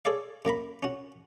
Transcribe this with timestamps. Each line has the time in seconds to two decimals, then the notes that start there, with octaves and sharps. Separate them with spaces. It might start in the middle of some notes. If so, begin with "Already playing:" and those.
0.05 G#4 A4 C#5 D5 F5
0.45 F#2 A#3 A#5 B5
0.83 C#4 F#4